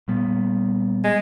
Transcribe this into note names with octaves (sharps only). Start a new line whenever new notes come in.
A#2 G3 B3
G#3